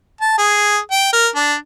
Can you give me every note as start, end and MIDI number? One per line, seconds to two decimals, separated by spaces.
0.21 0.36 81
0.38 0.78 68
0.91 1.11 79
1.13 1.28 70
1.36 1.54 62